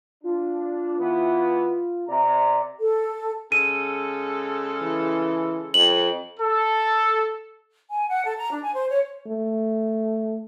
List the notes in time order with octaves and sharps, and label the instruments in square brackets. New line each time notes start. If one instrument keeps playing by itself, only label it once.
[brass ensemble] D4 [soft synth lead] F4
[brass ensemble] E3 B3
[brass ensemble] C3 A#5 [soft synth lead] D5
[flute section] A4
[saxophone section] C#3 G#3 A4 [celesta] D#7
[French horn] E3
[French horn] F2 [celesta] F#7
[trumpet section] A4
[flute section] G#5
F#5
A4
A#5
D4
G#5
C5
C#5
[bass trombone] A3